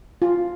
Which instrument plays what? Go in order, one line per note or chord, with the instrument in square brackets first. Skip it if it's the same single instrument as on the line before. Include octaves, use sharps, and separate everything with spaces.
[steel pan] F4